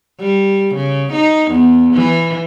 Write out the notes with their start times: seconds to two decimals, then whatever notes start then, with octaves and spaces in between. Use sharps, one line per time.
0.20 G3
0.75 C#3
1.13 D#4
1.51 E2
1.94 E3